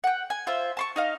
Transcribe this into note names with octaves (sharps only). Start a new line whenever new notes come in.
F#5 G5
G#5
F4 C5 E5
A5 C6 C#6
D#4 D#5 F5